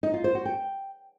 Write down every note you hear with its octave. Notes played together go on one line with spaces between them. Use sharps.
D#4
F4
C5
F#4
G5